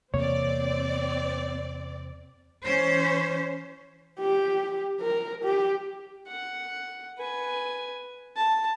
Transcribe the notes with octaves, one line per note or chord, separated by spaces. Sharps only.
E2 C3 A#3 C4 C#5 D5
E3 C#4 C5
G4
A#4
G4
F#5
B4 G#5
A5